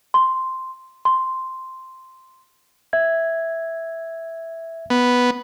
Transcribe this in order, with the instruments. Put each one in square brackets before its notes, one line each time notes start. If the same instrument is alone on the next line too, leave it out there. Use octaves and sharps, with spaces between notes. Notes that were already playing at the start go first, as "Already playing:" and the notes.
[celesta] C6
C6
[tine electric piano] E5 G#6
[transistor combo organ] B3